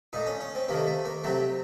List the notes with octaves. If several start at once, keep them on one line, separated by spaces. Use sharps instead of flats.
A#2 A3 D#4
C#4
C#4
C4
C3 D#3 A3 A#3
A3
A#3
C3 F#3 A3 C4